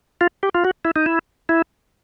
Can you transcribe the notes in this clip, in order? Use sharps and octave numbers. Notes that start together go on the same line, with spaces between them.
F4
G4
F4
F#4
E4
D#4
E4
E4